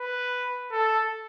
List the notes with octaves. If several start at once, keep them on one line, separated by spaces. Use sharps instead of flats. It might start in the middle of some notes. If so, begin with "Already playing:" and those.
Already playing: B4
A4